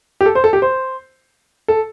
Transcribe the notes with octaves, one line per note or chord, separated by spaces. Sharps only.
G4
A4
C5
A4
G4
C5
A4